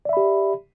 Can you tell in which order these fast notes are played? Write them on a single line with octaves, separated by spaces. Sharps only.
D5 E5 B5 G4